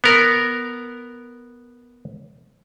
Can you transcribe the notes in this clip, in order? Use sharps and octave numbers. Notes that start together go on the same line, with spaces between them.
B3 A#4